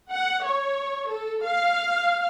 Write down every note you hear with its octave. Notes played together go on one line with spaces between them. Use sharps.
F#5
C#5
A4
F5